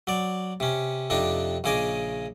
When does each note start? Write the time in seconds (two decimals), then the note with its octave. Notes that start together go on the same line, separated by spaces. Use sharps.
0.07 F#3 D5
0.60 C3 C#4
1.10 F2 C3 D4 D#4
1.64 A#1 C#3 G#4 D#5 D6